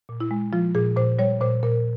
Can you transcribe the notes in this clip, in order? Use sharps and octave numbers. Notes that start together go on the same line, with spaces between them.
A#2
E4
G#3
F3 F4
A#2 G#4
A#2 C5
G3 C#5
A#2 C5
A#2 A#4